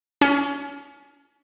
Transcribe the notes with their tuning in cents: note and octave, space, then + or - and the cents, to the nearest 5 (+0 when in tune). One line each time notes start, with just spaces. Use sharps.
C#4 +30